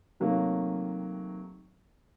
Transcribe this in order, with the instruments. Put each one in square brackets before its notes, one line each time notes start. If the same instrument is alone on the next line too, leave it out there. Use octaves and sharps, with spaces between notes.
[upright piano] C3 D#3 F#3 A3 A#3